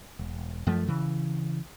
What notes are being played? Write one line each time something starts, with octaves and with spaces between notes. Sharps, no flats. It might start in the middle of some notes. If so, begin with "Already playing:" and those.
E1
F#2 F3 A3
C#3 E3